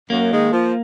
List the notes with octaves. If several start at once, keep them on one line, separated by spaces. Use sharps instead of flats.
F#2 A#3
D#3 G#3
F3